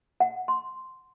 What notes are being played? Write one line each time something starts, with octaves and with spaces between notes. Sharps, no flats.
F#5
C6